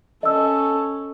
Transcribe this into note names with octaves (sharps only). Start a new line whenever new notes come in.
C#4 A4 D#5 E6